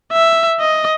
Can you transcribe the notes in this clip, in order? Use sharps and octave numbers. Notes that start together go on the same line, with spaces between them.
E5
D#5